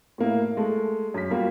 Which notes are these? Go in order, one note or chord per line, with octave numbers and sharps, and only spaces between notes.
A2 A#3 E4
G#3 A3
F#2 B6
G3 A#3 F4 F#4